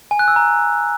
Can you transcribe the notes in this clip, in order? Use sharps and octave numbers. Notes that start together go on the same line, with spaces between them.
G#5
F#6
E6
A#5